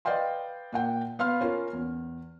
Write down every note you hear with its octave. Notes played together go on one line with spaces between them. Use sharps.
B4 D5 D#5 F5 G5 C6
A#2 F#5 G5
B3 F5 C6 F6
C#4 F4 A#4
E2